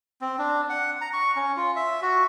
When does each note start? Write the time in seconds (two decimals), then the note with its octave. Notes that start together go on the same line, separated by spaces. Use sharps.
0.21 C4
0.38 D4
0.70 F#5
1.01 A#5
1.13 C#6
1.36 C#4
1.57 F4
1.76 E5
2.02 F#4